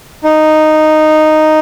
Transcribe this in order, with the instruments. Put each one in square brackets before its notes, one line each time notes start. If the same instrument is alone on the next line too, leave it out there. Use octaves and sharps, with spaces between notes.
[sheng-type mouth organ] D#4